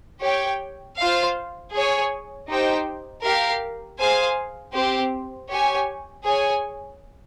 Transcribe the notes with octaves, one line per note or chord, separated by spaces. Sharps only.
G4 C#5 G5
F4 C5 F5
G#4 C#5 G#5
D#4 G4 C5 G5
G4 A#4 F5
G#4 C5 F5 G#5
C4 G4 C5
G4 C#5 G#5
G#4 C#5 G#5